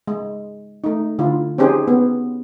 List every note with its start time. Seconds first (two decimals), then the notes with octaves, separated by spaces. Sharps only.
0.08 G#3
0.84 A3 D#4
1.19 D3 E4 F4
1.58 C4 C#4 D#4 G4 G#4 C5
1.88 B3